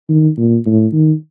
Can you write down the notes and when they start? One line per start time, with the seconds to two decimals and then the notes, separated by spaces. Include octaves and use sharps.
0.09 D#3
0.37 A#2
0.66 A2
0.93 D#3